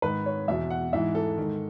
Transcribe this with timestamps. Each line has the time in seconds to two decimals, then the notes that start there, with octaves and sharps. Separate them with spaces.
0.02 G#2 D#3 B4
0.26 C#5
0.48 E2 B2 E5
0.70 F#5
0.93 G#2 E3 E5
1.15 A4
1.38 G#2 D#3